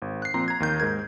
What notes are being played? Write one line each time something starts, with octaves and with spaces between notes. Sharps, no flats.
G#1
F#6 C7
A#2 F3 C4 A#5 C6
A#5 G#6
D#2 D#3 G6
G#2 A#4 G#6